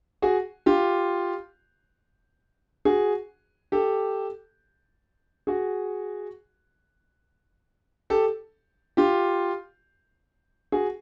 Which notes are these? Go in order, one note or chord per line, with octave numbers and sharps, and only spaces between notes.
F#4 G#4
F4 G4
F#4 G#4
G4 A4
F#4 G#4
G4 A4
F4 G4
F#4 G#4